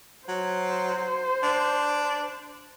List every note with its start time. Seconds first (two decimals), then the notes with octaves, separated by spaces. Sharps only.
0.28 F#3 C5
1.43 D4